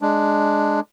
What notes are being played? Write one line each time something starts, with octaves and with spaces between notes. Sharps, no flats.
G#3 D4